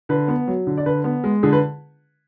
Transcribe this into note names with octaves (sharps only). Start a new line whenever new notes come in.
D3 B4
B3
F#3
D3
D5
D3 B4
B3
G#3
D3 G#4
B4